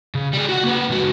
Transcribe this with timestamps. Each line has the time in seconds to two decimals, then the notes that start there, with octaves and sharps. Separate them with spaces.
0.15 C#3
0.33 G3 G#4
0.49 F#4 F#5
0.64 A#3 B4
0.90 C#2 F#4